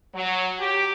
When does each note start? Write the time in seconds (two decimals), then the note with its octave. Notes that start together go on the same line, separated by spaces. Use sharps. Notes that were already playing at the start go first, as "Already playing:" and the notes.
0.14 F#3
0.59 G4